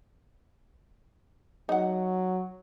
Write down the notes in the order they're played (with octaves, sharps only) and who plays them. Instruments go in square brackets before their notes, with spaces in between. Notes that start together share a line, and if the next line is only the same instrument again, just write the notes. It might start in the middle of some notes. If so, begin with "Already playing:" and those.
[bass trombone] F#3 [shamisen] D#4 F#5